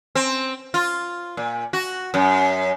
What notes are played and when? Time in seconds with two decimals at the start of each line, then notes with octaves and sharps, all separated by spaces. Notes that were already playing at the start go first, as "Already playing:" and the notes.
0.15 C4
0.74 F4
1.37 A#2
1.73 F#4
2.14 F#2